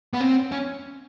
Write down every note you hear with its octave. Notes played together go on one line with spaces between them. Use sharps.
B3
C4
C#4